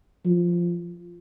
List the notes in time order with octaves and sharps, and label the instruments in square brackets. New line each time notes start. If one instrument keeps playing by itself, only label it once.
[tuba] F3